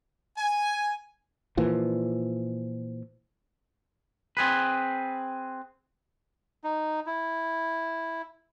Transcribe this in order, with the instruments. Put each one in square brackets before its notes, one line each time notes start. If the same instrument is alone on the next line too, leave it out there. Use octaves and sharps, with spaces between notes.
[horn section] G#5
[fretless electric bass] A#2 E3 F3
[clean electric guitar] C4 G#4 B4
[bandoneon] D#4
E4